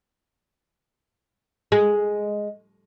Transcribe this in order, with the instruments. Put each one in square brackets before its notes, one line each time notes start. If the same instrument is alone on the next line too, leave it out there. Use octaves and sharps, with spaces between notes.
[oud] G#3